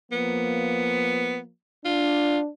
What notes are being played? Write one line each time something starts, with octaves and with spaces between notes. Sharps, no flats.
F3 A#3 B3
D4 F4